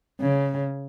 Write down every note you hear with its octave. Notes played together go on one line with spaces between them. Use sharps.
C#3